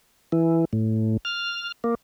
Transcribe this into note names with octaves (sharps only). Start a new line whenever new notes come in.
E3
A2
F6
A#3